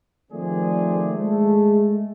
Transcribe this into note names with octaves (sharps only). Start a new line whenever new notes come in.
D#3 F3 A3 C4 G#4 D5
G#3 A3